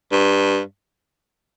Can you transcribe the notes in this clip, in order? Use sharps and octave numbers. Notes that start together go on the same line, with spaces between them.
G2